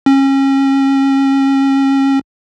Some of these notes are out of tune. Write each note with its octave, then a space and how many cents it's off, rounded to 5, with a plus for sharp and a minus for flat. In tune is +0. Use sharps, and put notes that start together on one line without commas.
C#4 -30